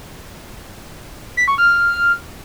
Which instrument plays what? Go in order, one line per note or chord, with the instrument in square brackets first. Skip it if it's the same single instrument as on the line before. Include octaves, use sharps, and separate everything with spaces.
[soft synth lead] B6
C#6
F6